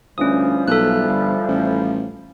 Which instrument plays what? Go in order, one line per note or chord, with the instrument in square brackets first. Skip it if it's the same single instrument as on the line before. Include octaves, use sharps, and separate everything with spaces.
[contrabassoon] D2 [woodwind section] E3 F3 G3 [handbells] C#4 D#6
[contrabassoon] B1 [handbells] A4 F#6
[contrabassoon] G1
A1